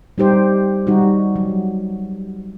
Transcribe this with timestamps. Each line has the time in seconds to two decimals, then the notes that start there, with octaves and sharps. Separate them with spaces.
0.18 G3 D#4 G4 C5
0.87 G3 D#4 F#4
1.36 F#3